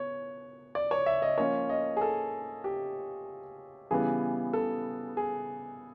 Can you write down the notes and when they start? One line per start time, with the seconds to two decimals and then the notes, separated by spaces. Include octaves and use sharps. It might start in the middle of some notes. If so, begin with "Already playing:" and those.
Already playing: B3 C#5
0.75 D5
0.91 C#5
1.06 E5
1.22 D#5
1.38 F3 A#3 C#4 F4 C#5
1.69 D#5
1.97 G#4
2.01 A4
2.64 G4
3.91 C#3 E3 G3 B3 G#4
4.53 A4
5.17 G#4